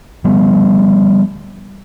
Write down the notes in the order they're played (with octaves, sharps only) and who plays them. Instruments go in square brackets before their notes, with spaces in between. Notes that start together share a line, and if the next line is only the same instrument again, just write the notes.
[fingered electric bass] C#3 F3 G3 B3